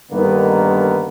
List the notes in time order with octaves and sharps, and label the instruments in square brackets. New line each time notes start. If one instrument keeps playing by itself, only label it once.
[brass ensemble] G2 D3 D#3 A#3 B3 D#4